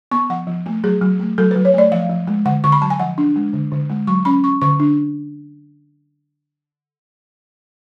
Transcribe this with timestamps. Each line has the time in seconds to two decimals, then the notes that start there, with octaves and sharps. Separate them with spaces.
0.11 B3 C#6
0.30 F3 F#5
0.47 F3
0.66 A3
0.84 F#3 G#4
1.01 F#3
1.20 A3
1.38 F#3 A4
1.51 F#3 B4
1.65 C#5
1.74 A3 D5
1.92 F3 F5
2.10 F3
2.27 G#3
2.45 D3 F#5
2.64 D3 C#6
2.72 B5
2.82 F#3 A5
2.90 G#5
2.99 F3 F#5
3.18 D4
3.36 G#3
3.53 D3
3.72 D3
3.90 G#3
4.07 F#3 C#6
4.25 C#4 B5
4.44 C#4 C#6
4.62 D3 C#6
4.80 D4